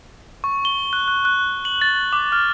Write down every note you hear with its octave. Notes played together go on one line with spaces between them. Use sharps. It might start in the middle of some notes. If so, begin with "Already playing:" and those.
C#6
G7
F#6
F#6
F#6
F#7
A6
D6
F6